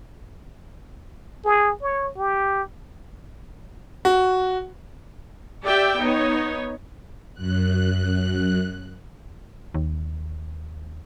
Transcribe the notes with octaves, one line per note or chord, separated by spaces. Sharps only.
G#4
C#5
G4
F#4
G4 D5 E5 G5
B3 D#4 C#5
F#2 F#6
D#2